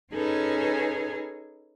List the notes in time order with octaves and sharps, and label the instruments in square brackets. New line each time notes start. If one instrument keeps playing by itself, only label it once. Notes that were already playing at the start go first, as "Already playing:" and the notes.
[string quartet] C#4 D#4 G#4 A4 B4 G#5